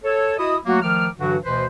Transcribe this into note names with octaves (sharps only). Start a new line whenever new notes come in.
A4 C#5
E4 F#4 D#5 D#6
F#3 A3 A#3 F#4
D#3 F3 A3 D6 F6
G2 D3 E3 F#3 F#4
D2 B2 E3 B4 C5